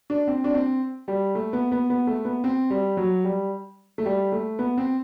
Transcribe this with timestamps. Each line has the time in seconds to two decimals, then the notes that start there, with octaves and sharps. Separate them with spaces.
0.10 D4
0.28 C4
0.44 D4
0.54 C4
1.08 G3
1.35 A3
1.53 B3
1.72 B3
1.90 B3
2.07 A3
2.25 B3
2.44 C4
2.70 G3
2.97 F#3
3.24 G3
3.98 A3
4.06 G3
4.32 A3
4.59 B3
4.77 C4